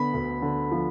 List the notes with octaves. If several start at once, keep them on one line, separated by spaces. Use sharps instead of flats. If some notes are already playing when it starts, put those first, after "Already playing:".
Already playing: D3 B3 B5
D2
D3
F3